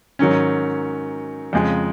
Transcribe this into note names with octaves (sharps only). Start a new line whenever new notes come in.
G#2 D#3 F#3 C#4
F2 C#3 G#3